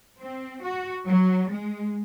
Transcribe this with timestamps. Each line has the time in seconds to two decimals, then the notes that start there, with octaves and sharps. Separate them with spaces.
0.19 C4
0.63 F#4
1.06 F#3
1.50 G#3